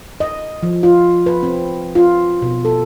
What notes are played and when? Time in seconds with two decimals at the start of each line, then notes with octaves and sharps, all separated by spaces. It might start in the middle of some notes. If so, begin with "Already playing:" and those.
0.20 D#5
0.63 F3
0.83 F4
1.26 B4
1.43 C4
1.95 F4
2.42 B2
2.65 A4